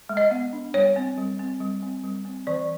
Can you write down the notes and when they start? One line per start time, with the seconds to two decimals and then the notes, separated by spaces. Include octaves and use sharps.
0.09 G#3
0.17 D#5
0.31 B3
0.53 D4
0.74 G3 C#5
0.96 C4
1.18 G3
1.39 C4
1.60 G3
1.83 C4
2.04 G3
2.25 C4
2.47 E3 D5